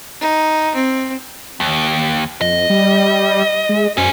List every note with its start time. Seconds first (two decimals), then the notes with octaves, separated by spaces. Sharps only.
0.21 D#4
0.75 C4
1.60 D#2
2.41 F2 D#5
2.70 G3
3.69 G#3
3.98 F#2 C#4 C5